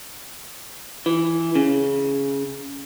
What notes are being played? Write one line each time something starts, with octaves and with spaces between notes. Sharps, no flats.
E3
C#3